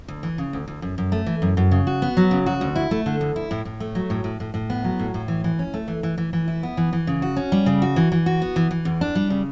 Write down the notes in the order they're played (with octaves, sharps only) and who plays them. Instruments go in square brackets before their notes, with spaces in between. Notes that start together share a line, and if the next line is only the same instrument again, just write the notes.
[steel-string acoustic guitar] D2
E3
C#3
D2
D2
F#2
F#2
A3
E3
F#2
F#2
C#3
F#4
B3
F#3
C#3
F#4
D2
E4
A3
D3
D2
E4
A2
A2
A3
F#3
A2
A2
A2
A2
B3
F#3
A2
A2
E3
E3
C#4
A3
E3
E3
E3
E3
E4
B3
E3
E3
C#3
F#4
C#4
G3
C#3
F#4
E3
E3
F#4
B3
E3
E3
E2
D4
G3
C#3